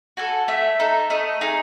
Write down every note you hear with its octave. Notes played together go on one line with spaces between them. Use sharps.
F#4 A4 G#5
A3 E5
D#4 A4
A3 D#5
D#4 G#4